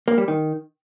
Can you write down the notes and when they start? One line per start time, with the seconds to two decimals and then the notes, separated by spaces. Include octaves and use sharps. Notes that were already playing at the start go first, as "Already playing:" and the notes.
0.08 A#3
0.18 G3
0.28 D#3